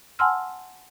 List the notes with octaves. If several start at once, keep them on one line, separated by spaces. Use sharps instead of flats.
F#5 G#5 A5 C6 E6 F6